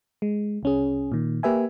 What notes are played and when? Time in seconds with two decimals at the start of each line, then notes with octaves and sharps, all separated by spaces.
0.22 G#3
0.63 C2 C#4 G#4
1.12 A#2 D#3
1.43 A#3 G4 B4 E5 G#5